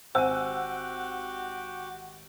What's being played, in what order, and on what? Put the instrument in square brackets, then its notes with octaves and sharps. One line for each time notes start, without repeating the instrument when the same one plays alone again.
[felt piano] G#1 F#5 E6 [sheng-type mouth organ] F#4 G4 [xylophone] C5 G#5